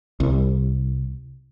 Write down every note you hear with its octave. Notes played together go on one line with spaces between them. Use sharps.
C2